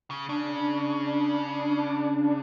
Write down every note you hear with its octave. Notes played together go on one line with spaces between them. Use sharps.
C#3
C#3 D4
D4
D4